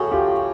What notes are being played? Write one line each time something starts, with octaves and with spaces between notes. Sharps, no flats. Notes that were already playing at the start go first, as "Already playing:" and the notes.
Already playing: A2 F#4 G#4 A4
F4 G4